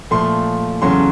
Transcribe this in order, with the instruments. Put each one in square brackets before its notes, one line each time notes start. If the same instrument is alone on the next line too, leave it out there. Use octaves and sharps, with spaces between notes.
[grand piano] A#2 F3 A3 C6
E2 C#3 F#3 A3 C#4 C6